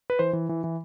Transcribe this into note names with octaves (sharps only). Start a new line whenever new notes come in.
B4
E3 C5
E3
E3
E3